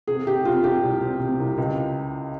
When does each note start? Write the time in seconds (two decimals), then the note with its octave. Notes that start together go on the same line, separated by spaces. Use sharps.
0.07 C3 G#4
0.26 C3 G4
0.45 C3 F4
0.64 C3 G4
0.83 C2
1.01 C3
1.20 C3
1.39 C2
1.58 C#2